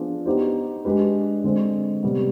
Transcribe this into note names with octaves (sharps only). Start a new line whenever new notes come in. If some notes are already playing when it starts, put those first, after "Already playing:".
Already playing: F3 B3 D4 F4 G#4
B3 D#4 G4 C5
G#3 D4 G4 B4
D3 G#3 C4
C3 G3 B3